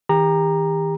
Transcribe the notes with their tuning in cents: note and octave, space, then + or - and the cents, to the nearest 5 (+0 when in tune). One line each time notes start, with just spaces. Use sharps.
D#3 +40 G4 +35 A#5 +0